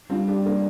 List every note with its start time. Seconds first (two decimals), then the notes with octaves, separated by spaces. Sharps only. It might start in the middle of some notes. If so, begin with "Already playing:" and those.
0.10 G2 C4 F4
0.28 D4 G4
0.45 A#3 D4